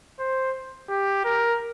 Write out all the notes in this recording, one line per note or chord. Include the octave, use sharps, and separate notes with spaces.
C5
G4
A#4